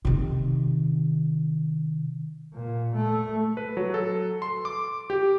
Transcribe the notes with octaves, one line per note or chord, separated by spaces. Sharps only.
C3 D#3
A#2
A3
B4
F#3
A4
C6
D6
G4